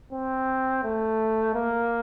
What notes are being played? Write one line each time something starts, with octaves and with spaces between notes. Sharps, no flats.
C4
A3
A#3